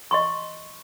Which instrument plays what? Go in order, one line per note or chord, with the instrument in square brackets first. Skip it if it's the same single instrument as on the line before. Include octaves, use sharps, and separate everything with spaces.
[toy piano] D#5 C6 C#6